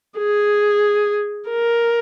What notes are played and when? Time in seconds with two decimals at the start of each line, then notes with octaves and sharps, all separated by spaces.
0.18 G#4
1.50 A#4